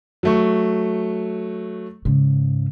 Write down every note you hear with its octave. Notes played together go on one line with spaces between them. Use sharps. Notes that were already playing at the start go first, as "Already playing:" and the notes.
F#3 A3 C#6
G#2 C#3